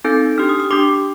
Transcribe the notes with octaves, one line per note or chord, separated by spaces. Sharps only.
C4 D#4 A4 G6
D4 G4 F6
D#6
D#6
D4 G4 D6